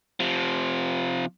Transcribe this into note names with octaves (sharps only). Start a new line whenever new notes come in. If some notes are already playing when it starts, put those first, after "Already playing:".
C3 F3